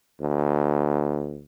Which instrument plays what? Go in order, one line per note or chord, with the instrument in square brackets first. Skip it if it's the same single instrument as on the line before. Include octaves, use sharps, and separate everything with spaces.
[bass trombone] D2